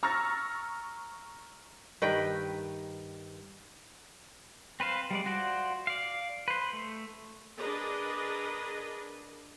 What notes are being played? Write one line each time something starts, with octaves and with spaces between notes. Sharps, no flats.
A#5 C#6 E6 F6 A6 A#6
G2 D#3 B4 G5
C4 B4 C5 F5
G3 G#3 D5
F4 F#4 C5 D5
D5 F5
B4 C5
A3
D4 G#4 A#4 B4 D#5